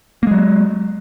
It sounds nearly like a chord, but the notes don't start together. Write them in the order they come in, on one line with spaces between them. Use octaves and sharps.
A#3 G#3 F#3